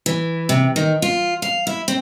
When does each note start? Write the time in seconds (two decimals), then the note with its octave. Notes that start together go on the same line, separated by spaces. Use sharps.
0.06 E3
0.49 C3
0.76 D#3
1.02 F4
1.42 F5
1.67 E4
1.88 C4